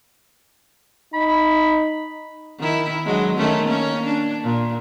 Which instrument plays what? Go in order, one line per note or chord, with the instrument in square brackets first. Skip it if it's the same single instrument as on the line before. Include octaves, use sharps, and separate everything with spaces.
[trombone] D#4 [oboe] B5
[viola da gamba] D#3 E4
D3 F#3 G#3
D#3 A3 C#4
A#3 C#4
D4
A#2